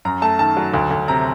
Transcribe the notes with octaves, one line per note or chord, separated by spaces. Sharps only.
F#2 A#5
A3 A5
D#3 A5
F#3
D2
D2
C3 A#5